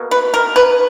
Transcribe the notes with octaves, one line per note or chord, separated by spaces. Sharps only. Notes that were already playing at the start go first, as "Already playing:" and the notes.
Already playing: B2 A#3
B4
A#4
B4